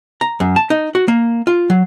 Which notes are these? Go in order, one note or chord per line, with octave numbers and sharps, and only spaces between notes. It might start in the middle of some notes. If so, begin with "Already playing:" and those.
A#5
F#2
A5
D#4
F#4
A#3
F4
F#3